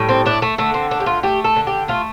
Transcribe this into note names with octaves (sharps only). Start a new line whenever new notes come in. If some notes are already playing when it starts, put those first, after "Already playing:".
Already playing: A2 G3
C4
A3 D4
A3
D3 A3
C4
A3 D4
G4
F4
A3 G4
A4
D3
G4
A3 F4